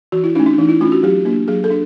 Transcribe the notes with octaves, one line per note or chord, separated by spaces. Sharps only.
E3 F#4
E4
A3 C#4 D#4
D4
E3 D#4
E4
A3 C#4 F4
F#4
F#3 G4
A#3 D4
F#3 G#4
A4
D4